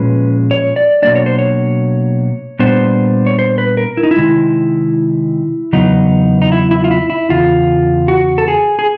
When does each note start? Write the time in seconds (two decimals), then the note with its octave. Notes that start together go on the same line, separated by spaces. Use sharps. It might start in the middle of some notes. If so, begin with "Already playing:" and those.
Already playing: A#2 F3 G#3 C#4 B4
0.51 C#5
0.76 D5
1.02 B2 F#3 A#3 D4 D5
1.15 C#5
1.26 C5
1.38 C#5
2.59 A#2 G3 B3 D4 C5
3.26 C#5
3.39 C5
3.58 B4
3.77 A#4
3.97 E4
4.03 D#4
4.11 E4
4.16 C3 D#3 G#3
5.73 E2 C#3 F#3 B3 D#4
6.42 D#4
6.52 E4
6.71 E4
6.84 F4
6.91 E4
7.10 E4
7.29 E2 C#3 F4
8.08 F#4
8.38 A4
8.48 G#4
8.79 G#4